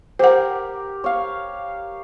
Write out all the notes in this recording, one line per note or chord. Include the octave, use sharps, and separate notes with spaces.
G4 A#4 C5 F#5
C#5 F5